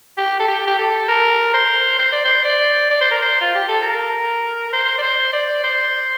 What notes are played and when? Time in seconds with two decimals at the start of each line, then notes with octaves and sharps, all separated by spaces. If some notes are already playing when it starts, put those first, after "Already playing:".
0.17 G4
0.40 A4
0.48 G4
0.67 G4
0.78 A4
1.08 A#4
1.54 C5
1.99 C5
2.12 D5
2.25 C5
2.44 D5
2.90 D5
3.01 C5
3.11 A#4
3.22 C5
3.41 F4
3.55 G4
3.68 A4
3.82 A#4
4.68 A#4
4.73 C5
4.98 D5
5.02 C5
5.33 D5
5.64 C5